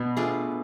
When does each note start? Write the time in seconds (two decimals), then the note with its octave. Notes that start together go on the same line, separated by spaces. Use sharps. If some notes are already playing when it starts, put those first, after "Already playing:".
Already playing: B2 B3
0.17 A3 D4 F4 G#4